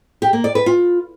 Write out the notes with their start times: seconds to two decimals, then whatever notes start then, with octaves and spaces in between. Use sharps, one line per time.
0.22 G4
0.33 A#3
0.44 D5
0.55 B4
0.66 F4